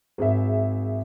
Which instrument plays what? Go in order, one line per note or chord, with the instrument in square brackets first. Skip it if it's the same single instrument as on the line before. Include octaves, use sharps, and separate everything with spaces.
[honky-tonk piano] G#1 G#4 E5